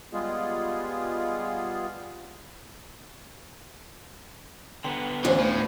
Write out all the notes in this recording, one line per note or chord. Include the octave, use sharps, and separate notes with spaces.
G3 G#3 B3 F4 G#4
D3 B3 G5 A#5 C6
D2 E3 C#4 F4 C5 F5
A2